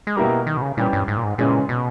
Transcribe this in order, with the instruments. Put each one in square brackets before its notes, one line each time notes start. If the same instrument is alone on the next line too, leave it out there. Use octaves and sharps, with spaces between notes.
[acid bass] G#3
[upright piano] B2 A#3 E4 G4 A#4 [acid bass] G3
[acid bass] D#3
B2
C#3
[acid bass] A#2 [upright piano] E3 G3 C#4 G4
[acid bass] G2
G#2
A#2
G#2
[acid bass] A#2 [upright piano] C#3 E3 G#3 C#4 G#4
[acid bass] B2